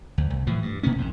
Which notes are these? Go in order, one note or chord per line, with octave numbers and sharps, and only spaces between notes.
D2
C2
A2 E3 F3
G2
B2 A#3 B3 C#4
A#1 F2 G#2